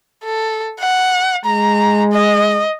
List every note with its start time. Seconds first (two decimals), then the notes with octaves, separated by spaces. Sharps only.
0.24 A4
0.80 F#5
1.45 G#3 A#5
2.12 D#5